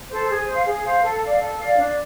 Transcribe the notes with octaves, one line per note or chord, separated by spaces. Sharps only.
A4 C5
G#4
C5 F5
G#4
C5 F5
A4
D5 F5
A4
D5 F5
D4